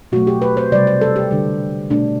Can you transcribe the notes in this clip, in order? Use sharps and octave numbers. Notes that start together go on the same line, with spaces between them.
B2 F#3 A3 F#4
G4
B4
C5
C3 G3 D5
C5
A4
G4
D3 G3
B2 A3 D4